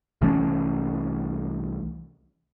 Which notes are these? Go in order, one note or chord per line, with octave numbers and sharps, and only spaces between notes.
C2 E3 A3 C#4